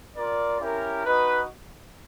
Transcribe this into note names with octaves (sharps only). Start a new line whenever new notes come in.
F4 A#4 D5
C#4 E4 G4 A#4
D#4 F#4 B4 D#5